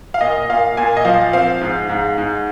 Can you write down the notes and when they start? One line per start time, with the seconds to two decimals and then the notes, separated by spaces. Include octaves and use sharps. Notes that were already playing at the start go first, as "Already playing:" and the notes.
0.14 F5
0.21 A#2 D#5
0.49 A#2 F5
0.77 A#2 G#5
0.97 D#5
1.05 F3 F5
1.33 C4 F5
1.61 G#2
1.89 G#2
2.18 G#2